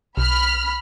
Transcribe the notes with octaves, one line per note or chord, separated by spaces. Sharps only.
B1 B5 F6